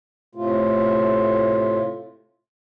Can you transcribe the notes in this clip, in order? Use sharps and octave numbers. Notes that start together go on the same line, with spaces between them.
A2 C3 A3 F4